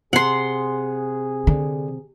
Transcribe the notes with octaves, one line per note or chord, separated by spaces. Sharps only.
C3 G#4 F#5 C6
D3